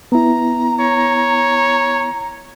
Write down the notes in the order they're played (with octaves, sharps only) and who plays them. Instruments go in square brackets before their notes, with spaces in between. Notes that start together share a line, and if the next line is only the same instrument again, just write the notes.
[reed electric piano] B3 E4 [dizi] A#5
[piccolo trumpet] C#5